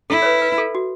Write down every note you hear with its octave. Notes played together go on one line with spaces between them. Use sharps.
E4 A4
C#5
B4
B4
A4
F#4